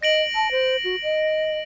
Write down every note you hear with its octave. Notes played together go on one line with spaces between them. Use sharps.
D#5 A#6 D7 F#7
A5
C5
F#4
D#5